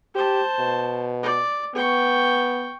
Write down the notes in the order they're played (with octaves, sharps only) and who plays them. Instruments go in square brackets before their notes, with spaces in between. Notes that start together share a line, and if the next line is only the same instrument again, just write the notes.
[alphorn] G4 [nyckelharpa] C5 A5
[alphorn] B2
[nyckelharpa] D5
[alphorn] B3 [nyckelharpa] G5 C#6